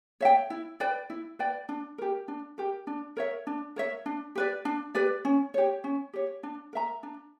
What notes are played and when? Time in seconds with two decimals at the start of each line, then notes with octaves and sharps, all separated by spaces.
0.21 C#5 E5 G5
0.50 E4
0.80 B4 D5 G5
1.10 E4
1.39 B4 D5 G5
1.69 D4
1.98 G4 A#4
2.28 D4
2.58 G4 A#4
2.87 D4
3.17 A#4 C#5 E5
3.47 D4
3.76 A#4 C#5 E5
4.06 D4
4.35 G4 B4 D5
4.65 D4
4.95 G4 B4 D5
5.25 C#4
5.54 G4 C#5
5.84 C#4
6.13 G4 C#5
6.43 D4
6.73 A#4 E5 A#5
7.03 D4